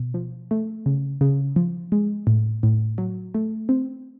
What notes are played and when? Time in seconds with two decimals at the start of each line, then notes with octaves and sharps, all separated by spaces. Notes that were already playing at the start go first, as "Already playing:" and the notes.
Already playing: B2
0.14 F3
0.51 A3
0.86 C#3
1.21 C#3
1.56 F3
1.92 G#3
2.27 A2
2.63 A2
2.98 F#3
3.34 A3
3.69 C4